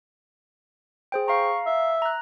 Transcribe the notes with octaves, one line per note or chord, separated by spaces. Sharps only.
G#4 C5 G5
F5 A#5 C#6
E5
A#5 F#6